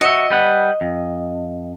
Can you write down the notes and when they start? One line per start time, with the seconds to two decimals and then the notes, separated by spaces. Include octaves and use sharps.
0.01 F#4 C#5 D#5 E5
0.30 G3 B4 F#5
0.81 F2